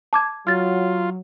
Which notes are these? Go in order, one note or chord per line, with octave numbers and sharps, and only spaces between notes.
A5 D6 G#6
F#3 F4 F6 A6